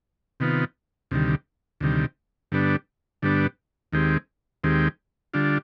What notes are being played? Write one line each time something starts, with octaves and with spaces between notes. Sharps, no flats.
C3 D#3 B3 F4
D2 C3 D#3 G3
D2 C3 D#3 G3
G2 D3 G3 B3 D4
G2 D3 G3 B3 D4
D#2 D#3 G#3 C4 G4
D#2 D#3 G#3 C4 G4
D3 G3 D4 F4